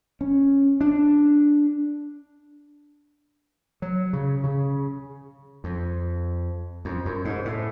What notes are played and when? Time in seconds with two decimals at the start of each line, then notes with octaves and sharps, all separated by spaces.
0.21 C#4
0.81 D4
3.82 F#3
4.13 C#3
4.44 C#3
5.64 F2
6.85 F2
7.05 F#2
7.25 G#2
7.45 A2